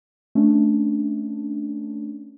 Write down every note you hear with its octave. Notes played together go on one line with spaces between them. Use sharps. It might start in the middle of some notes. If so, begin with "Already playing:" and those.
A3 C#4 D4